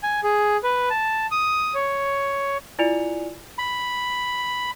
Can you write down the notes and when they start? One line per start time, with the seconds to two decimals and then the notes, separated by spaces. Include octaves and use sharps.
0.03 G#5
0.24 G#4
0.63 B4
0.90 A5
1.31 D#6
1.75 C#5
2.79 E4 F4 D5 G#5 C#7 F7
3.58 B5